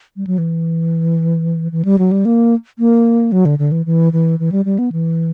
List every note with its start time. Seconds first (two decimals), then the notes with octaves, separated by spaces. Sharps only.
0.16 G3
0.27 F#3
0.38 E3
1.72 E3
1.85 G3
1.98 F#3
2.12 G3
2.25 A#3
2.79 A#3
3.32 F#3
3.45 D3
3.59 D3
3.72 E3
3.86 E3
4.13 E3
4.39 E3
4.52 G3
4.65 G3
4.79 B3
4.92 E3